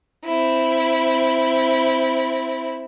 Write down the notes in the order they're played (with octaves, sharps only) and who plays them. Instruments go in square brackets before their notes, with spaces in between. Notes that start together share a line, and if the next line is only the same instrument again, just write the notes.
[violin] C4 E4